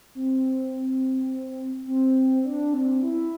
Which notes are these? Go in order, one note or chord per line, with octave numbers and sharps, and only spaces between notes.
C4
C4
D4
C4
E4